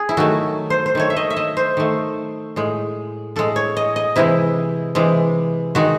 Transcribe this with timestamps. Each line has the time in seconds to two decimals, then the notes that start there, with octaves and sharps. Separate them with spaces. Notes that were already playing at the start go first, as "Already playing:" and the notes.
Already playing: G#4
0.09 E4
0.17 D#3 F#3 A3 F#4
0.70 C5
0.86 C5
0.95 D#3 A3 C#5
1.10 E5
1.16 D#5
1.30 E5
1.37 D#5
1.57 C5
1.77 D#3 A3
2.56 A2 G#3
3.36 A2 G#3 A4
3.56 C#5
3.77 D#5
3.96 D#5
4.16 C3 E3 G#3 E4
4.95 C3 E3 G#3
5.75 D#3 G#3 F#4